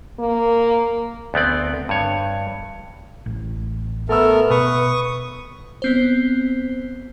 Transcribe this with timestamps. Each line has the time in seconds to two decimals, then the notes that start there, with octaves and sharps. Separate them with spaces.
0.19 A#3
1.34 D2 B3 C4 D5
1.89 G2 C#5
3.26 A1
4.09 A3 B3 A4 A#4 E6
4.50 B2 B4 C#6 D#6
5.82 B3 C4 C5